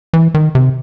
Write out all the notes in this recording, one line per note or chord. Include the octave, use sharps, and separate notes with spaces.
E3
D#3
C3